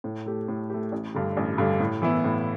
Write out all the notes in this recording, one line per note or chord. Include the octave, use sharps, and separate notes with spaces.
A2
A3 G4
A2
A3 G4
A1
G2 D3
A1
G2 D3
A2
E3 B3 E4
A2